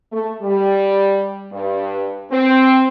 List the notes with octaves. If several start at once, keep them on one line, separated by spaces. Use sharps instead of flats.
A3
G3
G2
C4